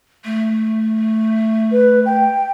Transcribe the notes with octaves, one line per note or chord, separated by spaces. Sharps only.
A3
B4
G5